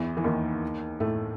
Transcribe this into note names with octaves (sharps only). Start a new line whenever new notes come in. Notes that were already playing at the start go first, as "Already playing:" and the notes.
Already playing: E2 E3
E3
D#2 D#3
A2 A3